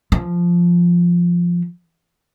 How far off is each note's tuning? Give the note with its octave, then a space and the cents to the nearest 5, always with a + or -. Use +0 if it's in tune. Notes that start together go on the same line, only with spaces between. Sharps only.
F3 -5